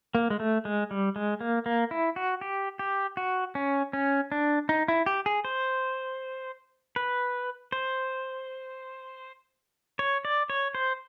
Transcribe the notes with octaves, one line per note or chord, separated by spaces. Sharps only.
A#3
G#3
A3
G#3
G3
G#3
A#3
A#3
E4
F#4
G4
G4
F#4
C#4
C#4
D4
D#4
E4
G4
G#4
C5
B4
C5
C#5
D5
C#5
C5